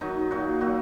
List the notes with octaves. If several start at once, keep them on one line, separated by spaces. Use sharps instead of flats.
D#3 F#3 D#4
A#2 F#3 F#4
A#2 F#3 F#4